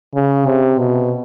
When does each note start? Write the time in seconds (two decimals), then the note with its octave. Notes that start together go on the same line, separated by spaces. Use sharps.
0.14 C#3
0.47 C3
0.79 B2